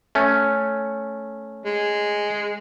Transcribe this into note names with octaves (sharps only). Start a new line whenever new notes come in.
A3 C#4
G#3